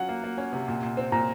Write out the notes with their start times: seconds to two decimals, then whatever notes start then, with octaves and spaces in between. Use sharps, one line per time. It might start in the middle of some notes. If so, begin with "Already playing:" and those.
Already playing: F#3 C#4 F4 F#5
0.09 A#3
0.24 A#3
0.38 C#4
0.53 C3
0.68 A#2
0.82 A#2
0.97 C4
1.12 A#2 A#5